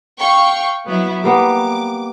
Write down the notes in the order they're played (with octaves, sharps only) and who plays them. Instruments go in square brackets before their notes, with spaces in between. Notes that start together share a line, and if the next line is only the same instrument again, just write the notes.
[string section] F5 G5 C#6
F#3 B3 E4
[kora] G3 A#3 B3 [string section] D6